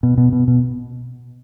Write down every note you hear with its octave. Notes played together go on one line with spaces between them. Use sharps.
B2
B2
B2
B2